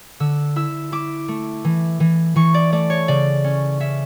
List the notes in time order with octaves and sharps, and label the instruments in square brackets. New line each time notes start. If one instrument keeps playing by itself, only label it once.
[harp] D3 E6
E4 E6
E4 D6
A3
E3
E3
E3 C#6
D5
A3 D5
C#5
C#3 D5
C#4
C#4 E5